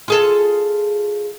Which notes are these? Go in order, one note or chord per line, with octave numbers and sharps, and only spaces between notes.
F4 G#4 A4